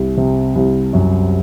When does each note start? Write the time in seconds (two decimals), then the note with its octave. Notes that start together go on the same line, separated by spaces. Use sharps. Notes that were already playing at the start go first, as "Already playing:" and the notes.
Already playing: C2
0.17 C3
0.56 C2
0.93 F#2